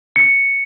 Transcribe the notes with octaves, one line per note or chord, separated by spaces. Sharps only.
C#7